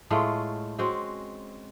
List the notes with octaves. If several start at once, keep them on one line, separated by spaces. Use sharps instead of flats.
A2 G#3 A3 F4
G#3 C4 C#4 F#4